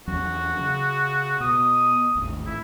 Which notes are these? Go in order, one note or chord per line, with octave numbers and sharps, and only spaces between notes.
E2 F#3 C#4 F#4
C#3
B2 D#6
G#1 D#2 A2
E4